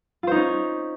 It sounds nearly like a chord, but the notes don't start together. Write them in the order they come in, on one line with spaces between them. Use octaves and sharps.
F4 C5 D#4 C#4